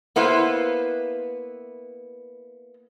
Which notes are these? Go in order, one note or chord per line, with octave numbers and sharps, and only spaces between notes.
A#3 B3 E4 B4 C5